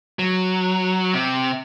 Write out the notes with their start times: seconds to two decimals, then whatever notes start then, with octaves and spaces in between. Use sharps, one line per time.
0.19 F#3
1.14 C3